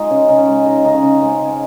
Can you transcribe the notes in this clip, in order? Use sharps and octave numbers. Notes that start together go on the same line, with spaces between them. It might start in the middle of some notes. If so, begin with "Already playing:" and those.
Already playing: G#3 D#4 F4
C#3 C#4
C#3 D#4
C#4
G#3
C#3 D#4
C#3 D#4
C#4
C#3
G#3 C4
C#3
C#4